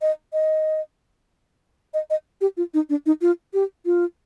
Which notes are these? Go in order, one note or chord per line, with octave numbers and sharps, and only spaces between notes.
D#5
D#5
D#5
D#5
G4
F4
D#4
D4
D#4
F4
G4
F4